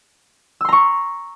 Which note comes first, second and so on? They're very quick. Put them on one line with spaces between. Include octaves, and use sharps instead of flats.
E6 C6 A#5 C#6